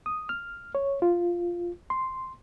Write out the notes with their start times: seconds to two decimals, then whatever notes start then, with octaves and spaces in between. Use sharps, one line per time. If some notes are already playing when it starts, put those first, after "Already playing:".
0.06 D#6
0.29 F6
0.75 C#5
1.02 F4
1.90 C6